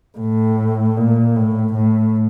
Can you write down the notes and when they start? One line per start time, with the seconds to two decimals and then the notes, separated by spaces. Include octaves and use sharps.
0.18 A2
0.97 A#2
1.36 A2
1.74 A2